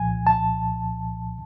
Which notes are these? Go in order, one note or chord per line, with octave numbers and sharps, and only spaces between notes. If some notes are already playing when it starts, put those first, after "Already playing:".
Already playing: C2 A#2 F3 G#5
A5